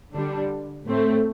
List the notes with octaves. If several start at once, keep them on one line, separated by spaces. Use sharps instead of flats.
D3 G3 D4
A2 A3 C4